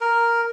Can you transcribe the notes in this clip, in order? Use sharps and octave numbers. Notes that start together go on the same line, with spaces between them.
A#4